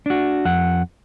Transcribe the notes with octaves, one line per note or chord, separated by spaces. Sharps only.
D4 F#4
F2 F#5